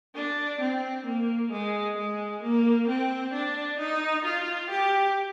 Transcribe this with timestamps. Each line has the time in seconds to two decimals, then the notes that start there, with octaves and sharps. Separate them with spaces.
0.15 D4
0.60 C4
1.06 A#3
1.52 G#3
1.97 G#3
2.43 A#3
2.88 C4
3.33 D4
3.79 D#4
4.25 F4
4.70 G4